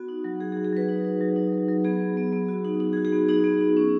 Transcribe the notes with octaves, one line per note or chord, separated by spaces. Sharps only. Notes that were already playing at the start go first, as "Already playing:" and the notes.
Already playing: B3 F#4
D#4
F#3
F#3 G#4
G#4
F#3
G#4
F#3 B4
D#4
D#4
F#3
D#4
F#3
F#3
B3 G#4
B3
B3
B3
F#4
D#4
D#4
G#4
F#4
G#4
B3
D#4 G#4
B3
D#4
C#4